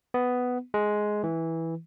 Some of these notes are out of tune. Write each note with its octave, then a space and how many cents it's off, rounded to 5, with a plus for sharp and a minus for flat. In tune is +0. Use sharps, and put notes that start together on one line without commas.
B3 +10
G#3 +10
E3 -10